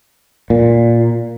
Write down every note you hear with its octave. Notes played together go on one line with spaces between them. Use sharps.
A#2